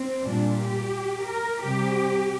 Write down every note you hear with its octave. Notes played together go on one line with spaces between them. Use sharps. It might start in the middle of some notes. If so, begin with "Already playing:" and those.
Already playing: C4
A#2 G3 D4
G4
A#4
C3 G3 G4